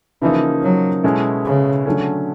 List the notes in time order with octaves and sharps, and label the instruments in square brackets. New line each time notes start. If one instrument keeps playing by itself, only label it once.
[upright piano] C#3 F3 A#3 D#4 [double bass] E3
[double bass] F#3
[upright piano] B2 G#3 C#4 E4 A4
[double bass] C#3
[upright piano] D3 F#3 A3 C#4